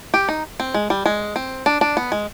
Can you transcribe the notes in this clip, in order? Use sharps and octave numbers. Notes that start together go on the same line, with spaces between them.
G4
D#4
C4
G#3
G3
G#3
C4
D4
D4
B3
G#3